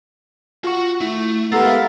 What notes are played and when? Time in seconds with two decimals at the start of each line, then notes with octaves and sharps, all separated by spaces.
0.64 F4 F#4 F#5 C#6
1.01 A3 E4
1.52 G#3 B3 G4 A4 A#4 E5 A6
1.66 F5